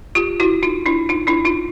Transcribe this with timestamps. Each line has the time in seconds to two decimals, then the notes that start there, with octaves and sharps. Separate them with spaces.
0.15 F4 G4
0.40 E4 F#4
0.63 D#4 F4
0.86 D4 E4
1.09 D#4 F4
1.27 D4 E4
1.45 D#4 F4